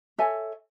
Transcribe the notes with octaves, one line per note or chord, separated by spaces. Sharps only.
A4 C#5 E5 G#5